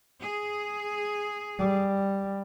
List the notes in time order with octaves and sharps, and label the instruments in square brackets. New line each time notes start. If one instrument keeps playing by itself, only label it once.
[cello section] G#4
[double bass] G3